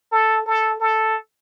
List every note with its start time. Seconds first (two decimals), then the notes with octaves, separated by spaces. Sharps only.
0.12 A4
0.46 A4
0.80 A4